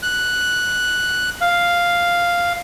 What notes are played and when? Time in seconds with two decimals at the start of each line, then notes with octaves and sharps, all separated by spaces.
0.03 F#6
1.41 F5